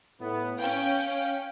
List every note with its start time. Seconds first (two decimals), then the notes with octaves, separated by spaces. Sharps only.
0.20 A2 B3
0.58 C#4 F5 G5